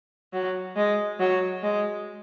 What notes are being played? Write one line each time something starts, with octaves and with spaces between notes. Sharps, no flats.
F#3
G#3
F#3
G#3